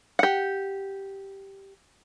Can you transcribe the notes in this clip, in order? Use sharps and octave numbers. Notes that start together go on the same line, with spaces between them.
G4 F#5